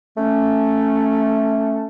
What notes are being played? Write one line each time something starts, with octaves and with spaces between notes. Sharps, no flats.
A3 C#4